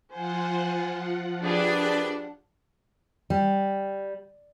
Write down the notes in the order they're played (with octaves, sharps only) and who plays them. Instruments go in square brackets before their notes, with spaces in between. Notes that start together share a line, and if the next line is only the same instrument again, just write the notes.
[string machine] F3 F4 F#5 [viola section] C5 [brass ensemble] G#5
[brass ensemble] C2 B4 D5 [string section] D4 [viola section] G4 G#4
[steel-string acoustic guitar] G3